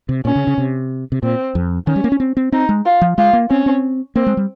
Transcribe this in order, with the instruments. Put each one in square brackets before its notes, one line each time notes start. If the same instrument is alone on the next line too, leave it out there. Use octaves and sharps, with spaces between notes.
[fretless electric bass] C3
[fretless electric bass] A#2 [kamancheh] C#4
[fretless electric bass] C#3
C#3
C3
C3
[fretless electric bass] A#2 [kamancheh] C4
[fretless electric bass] F2
[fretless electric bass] D#3 [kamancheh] C#4
[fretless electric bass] G3
A#3
C#4
C4
C4
[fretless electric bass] C4 [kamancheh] D#4
[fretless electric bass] G#3
[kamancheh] F4
[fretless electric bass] F3
[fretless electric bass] G#3 [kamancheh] F4
[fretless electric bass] A#3
[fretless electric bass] C4 [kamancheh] C#4
[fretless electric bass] C4
[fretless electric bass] A#3 [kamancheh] C4
[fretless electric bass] G#3
G3